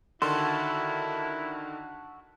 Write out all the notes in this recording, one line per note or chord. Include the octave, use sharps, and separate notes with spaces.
D3 D#3 E4 F#4 A4 C6